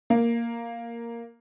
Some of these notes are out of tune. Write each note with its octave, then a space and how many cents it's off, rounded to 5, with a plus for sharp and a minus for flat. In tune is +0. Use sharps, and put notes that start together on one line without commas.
A#3 +0